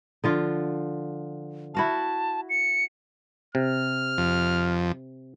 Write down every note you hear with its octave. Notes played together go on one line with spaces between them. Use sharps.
D3 F3 F4
E4 F#4 F5 A5
C#7
C3 F6
F2